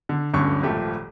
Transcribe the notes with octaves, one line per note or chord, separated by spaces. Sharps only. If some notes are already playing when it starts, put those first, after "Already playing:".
D3
D1 G2 D3 C#4 C#6
D#1 G#1 F3 A3 G4